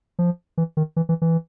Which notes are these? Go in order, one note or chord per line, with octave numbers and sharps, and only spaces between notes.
F3
E3
D#3
E3
E3
E3